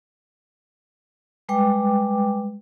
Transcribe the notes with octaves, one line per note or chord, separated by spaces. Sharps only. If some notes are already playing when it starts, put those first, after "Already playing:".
G3 G#3 B4 G5 D6